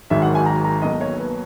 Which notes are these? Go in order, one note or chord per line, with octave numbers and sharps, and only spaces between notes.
G#1 G#2 D#3 F#3 E5
F#5
G#5
A#5
A#5
B1 B2 A#3 D#5
C#5
B4